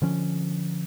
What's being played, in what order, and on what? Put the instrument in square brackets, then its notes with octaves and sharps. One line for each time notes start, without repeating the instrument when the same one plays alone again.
[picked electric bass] D3 F3 C#4